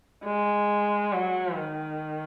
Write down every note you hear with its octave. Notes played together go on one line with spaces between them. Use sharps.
G#3
F#3
D#3